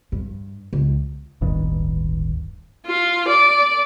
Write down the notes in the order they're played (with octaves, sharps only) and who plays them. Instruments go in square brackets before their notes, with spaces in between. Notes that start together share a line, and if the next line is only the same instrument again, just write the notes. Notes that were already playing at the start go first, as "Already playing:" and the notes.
[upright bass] G2
C#2
[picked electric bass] D1 G1 G2 D#3
[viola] F4
D5